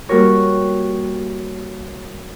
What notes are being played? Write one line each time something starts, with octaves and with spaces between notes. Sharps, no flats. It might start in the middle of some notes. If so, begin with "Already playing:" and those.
G3 A#3 F#4 A#4 C#5